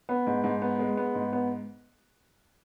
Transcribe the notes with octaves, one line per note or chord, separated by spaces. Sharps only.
B3
G#2
G#2
B3
G#3
B3
G#2
B3